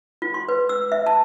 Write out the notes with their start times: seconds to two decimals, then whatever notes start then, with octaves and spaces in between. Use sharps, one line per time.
0.22 F4
0.34 C6
0.49 B4
0.69 E6
0.92 E5
1.06 A5